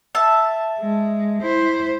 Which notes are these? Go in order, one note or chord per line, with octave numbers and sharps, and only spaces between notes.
E5 A5
G#3
E4 C5